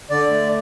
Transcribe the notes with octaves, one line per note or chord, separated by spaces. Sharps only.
D3 D5
A3